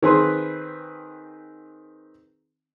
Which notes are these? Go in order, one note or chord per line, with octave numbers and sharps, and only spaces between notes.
D#3 C4 G#4 B4 C6